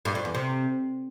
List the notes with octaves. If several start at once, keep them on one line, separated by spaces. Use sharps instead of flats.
G2
F2
E2
C3